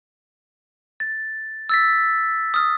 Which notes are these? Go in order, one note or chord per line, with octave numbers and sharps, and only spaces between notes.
A6
E6 A6 B6
D#6 F6